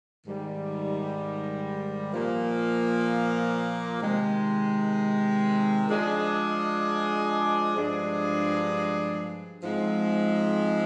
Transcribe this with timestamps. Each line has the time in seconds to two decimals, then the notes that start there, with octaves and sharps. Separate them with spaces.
0.25 G#2 D#3 G3
2.12 A#2 F3 A#3
4.00 C3 D#3 G#3
5.88 F3 G#3 D4 G#4 D#5
7.75 G2 F3 G#3 D4 G#4
9.63 G#2 F3 G#3 C4